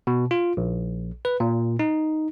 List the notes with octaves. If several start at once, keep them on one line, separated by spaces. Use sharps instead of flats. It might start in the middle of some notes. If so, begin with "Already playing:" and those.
B2
F4
A#1
B4
A#2
D#4